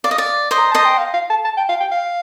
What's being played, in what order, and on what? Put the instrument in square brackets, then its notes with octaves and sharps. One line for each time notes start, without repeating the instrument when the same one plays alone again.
[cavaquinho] D5 [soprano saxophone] F5
[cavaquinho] D#5
D5
C5 D#5
[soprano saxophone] A#5
[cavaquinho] C5 D#5 [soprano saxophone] A5
[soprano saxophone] G5
F5
F5
A5
A5
G5
F5
G5
F5